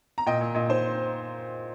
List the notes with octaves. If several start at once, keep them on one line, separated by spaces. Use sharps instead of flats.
A#5
A#2 D#5 G5
A#2
A#2 D#5
D#4 C5